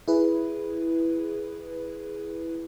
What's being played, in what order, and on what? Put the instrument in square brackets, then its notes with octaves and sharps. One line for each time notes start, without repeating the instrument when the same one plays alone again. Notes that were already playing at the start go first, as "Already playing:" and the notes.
[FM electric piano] E4 G#4 B4